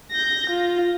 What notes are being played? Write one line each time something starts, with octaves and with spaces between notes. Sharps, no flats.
G6 A#6
F4